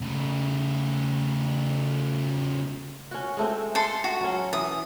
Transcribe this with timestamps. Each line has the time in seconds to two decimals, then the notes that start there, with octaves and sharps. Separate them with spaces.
0.01 C#3 A3
3.11 C#4 F#4
3.37 G#3 A3 C4
3.75 A4 C6
4.04 F#4
4.21 F#3 C#4
4.53 E3 D#6